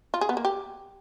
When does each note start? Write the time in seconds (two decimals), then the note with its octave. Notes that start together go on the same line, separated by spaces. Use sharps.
0.14 F4
0.21 G#4
0.29 B3
0.37 A#3
0.45 G4